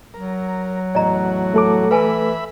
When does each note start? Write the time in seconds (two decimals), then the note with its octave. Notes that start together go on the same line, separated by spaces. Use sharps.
0.14 F#3 A#4
0.95 E2 A2 F#4 D5 D#5 A#5
1.54 A3 A4 D6
1.91 E3 B4 E5 G#5 A5 B5